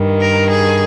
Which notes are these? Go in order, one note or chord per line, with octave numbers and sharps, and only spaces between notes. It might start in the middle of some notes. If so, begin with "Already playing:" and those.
Already playing: G2 D#3
A#4
G#4